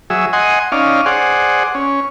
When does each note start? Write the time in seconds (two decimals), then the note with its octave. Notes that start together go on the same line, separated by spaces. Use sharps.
0.10 F#3 G#4 E5
0.33 D#5 F#5 G#5 C6
0.72 C#4 D#4 D5 F5
1.06 G#4 C5 D5 F#5
1.75 C#4